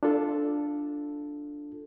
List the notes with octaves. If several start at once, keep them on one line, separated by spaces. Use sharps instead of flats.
D4 F4 A4